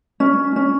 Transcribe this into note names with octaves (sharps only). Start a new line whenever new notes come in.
C#4
C#4